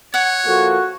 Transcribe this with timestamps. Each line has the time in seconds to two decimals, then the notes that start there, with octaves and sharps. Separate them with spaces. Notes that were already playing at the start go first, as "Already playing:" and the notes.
0.14 C#5 F#5
0.46 F3 A#3 F#4 A4